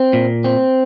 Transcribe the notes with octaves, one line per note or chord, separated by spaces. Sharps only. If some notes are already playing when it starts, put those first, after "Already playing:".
Already playing: C4
A#2
C4